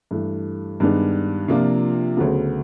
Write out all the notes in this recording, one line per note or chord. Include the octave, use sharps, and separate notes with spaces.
G2 E3 A3
G2 D#3 G#3 B3 D4
C3 F3 A#3 D4 F4
D2 C#3 F#3 B3